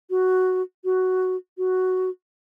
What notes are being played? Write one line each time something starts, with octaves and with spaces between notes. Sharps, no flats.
F#4
F#4
F#4